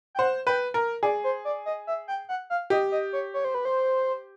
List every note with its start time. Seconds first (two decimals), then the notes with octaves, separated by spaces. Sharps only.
0.15 G5
0.19 C5 F#5
0.47 B4 G5
0.74 A#4
1.03 G#4 D5
1.24 C5
1.45 D5
1.66 D#5
1.87 E5
2.08 G5
2.29 F#5
2.50 F5
2.70 G4 D#5
2.92 D#5
3.13 C#5
3.34 C#5
3.45 C5
3.55 B4
3.65 C5